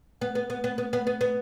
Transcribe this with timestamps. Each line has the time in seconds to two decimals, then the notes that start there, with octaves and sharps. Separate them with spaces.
0.21 B3
0.35 B3
0.50 B3
0.64 B3
0.78 B3
0.93 B3
1.07 B3
1.21 B3